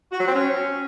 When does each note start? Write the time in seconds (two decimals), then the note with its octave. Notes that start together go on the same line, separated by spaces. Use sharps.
0.11 F#4
0.19 F#3
0.26 C4
0.34 C#4